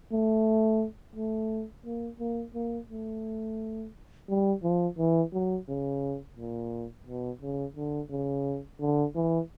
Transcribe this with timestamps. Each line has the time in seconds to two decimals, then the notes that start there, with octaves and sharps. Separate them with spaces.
0.12 A3
1.16 A3
1.85 A#3
2.20 A#3
2.55 A#3
2.90 A3
4.29 G3
4.63 F3
4.98 E3
5.33 F#3
5.68 C#3
6.37 A#2
7.07 B2
7.41 C#3
7.77 D3
8.10 C#3
8.80 D3
9.15 E3